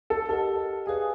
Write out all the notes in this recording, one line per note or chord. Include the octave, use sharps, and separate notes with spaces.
A4
G4 A4 A#4 D#5 F#5
G#4 B4 D5 F5 G#5